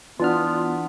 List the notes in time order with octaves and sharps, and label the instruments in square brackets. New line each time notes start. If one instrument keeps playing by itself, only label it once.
[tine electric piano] E3 D4 F6 [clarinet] B3 [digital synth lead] F4